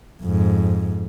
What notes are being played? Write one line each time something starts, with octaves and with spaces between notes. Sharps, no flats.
F2 G#2